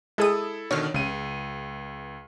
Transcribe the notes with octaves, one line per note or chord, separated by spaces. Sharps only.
G#3 E4 G#4 A4 D#6
B2 D3 D#3 C#5 F6
C#2 C#3 D#7